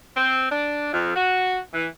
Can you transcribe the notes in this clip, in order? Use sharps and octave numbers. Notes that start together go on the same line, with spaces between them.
C4
D4
F2
F#4
E3